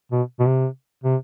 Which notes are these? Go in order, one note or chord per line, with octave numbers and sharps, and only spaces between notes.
B2
B2
C3
C3